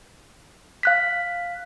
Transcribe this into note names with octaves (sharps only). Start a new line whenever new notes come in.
F5 F#6 B6